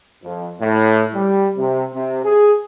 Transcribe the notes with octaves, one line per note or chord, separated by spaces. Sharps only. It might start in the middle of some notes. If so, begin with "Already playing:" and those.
F2
A2
G3
C3
C3
G#4